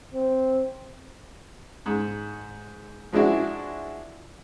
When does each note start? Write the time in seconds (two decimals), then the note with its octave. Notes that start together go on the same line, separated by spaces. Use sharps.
0.13 C4
1.86 G#2
3.12 F3 G#3 D4 E4 F#4